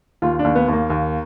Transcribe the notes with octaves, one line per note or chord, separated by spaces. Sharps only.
D#2 F4
D4
D#2
B3
D#2 A#3
D#2